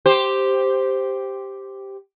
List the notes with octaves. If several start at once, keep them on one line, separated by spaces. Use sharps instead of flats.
G4 C5